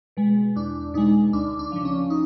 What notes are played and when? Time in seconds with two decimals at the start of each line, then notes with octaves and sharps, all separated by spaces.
0.17 B2 G#3
0.56 E2 D4
0.94 B2 G#3 D#4
1.33 D2 D4
1.59 D4
1.72 C#3 F3
1.85 C#4
2.10 D#4